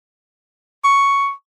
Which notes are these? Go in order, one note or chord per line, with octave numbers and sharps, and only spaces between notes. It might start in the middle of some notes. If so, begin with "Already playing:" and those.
C#6